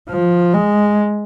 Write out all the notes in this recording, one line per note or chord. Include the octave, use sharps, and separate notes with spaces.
F3
G#3